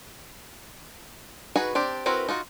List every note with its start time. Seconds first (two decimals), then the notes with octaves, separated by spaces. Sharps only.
1.56 D#4 F#4 G#4 B4
1.75 C4 D4 G4
2.06 C4 E4 F#4 A#4 B4
2.29 D#4 F4 F#4